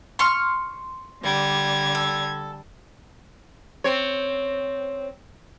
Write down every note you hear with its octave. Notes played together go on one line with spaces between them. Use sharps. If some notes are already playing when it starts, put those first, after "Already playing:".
C6 C#6 F6
D3 G3 G#6
A4
C4 C#5